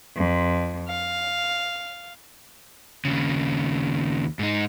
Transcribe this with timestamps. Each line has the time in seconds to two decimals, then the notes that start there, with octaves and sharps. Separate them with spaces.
0.17 F2
0.88 F5
3.05 D#2 C#3
4.39 G#2 D#4